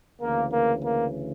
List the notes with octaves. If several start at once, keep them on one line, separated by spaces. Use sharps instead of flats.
D2 C#3 E3 A#3
A#3
A#3